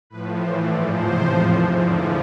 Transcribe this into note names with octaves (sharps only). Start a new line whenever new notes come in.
A2 F3 B4
A2 E3 C5
G#2 F3 D5
E2 C3 F3 C5
A2 F3
G#2 E3
F2 D3 F3 D5